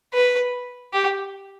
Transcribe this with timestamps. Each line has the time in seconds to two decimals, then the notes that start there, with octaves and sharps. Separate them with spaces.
0.14 B4
0.93 G4